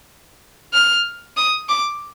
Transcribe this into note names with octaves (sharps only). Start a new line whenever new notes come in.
F6
D#6
D6